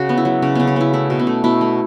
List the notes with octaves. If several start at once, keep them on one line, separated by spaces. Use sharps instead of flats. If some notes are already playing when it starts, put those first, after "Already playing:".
Already playing: C#3 F#4
B3
E4
F#3
C#3 C#4
C#3 B3
C#4
B3 E4
A3 E4
B2
B3
A3
B2 E4
A3